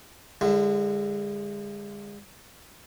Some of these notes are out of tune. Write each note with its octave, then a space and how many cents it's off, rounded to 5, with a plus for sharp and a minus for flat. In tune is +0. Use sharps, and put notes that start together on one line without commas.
D3 +0 G#3 -30 E4 +30